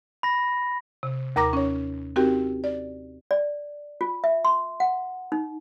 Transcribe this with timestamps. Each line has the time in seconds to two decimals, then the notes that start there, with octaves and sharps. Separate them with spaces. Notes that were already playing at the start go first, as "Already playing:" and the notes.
0.23 B5 A#6
1.03 C3
1.36 D#2 A#4 A#5 D6 A#6
1.53 C#4 C#5
2.16 C4 D#4 F#4 G4 A#4 G5
2.64 D5
3.31 D5
4.01 F4
4.24 E5
4.45 C6
4.80 F#5
5.32 D#4